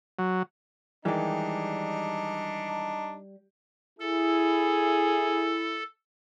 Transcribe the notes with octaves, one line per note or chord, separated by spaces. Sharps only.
F#3
D#3 E3 G3 G#3 D4 D#4 G4
E4 G#4 A4